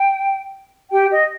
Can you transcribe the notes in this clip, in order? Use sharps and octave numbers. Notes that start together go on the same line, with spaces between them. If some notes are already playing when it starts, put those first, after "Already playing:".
Already playing: G5
G4 G5
D#5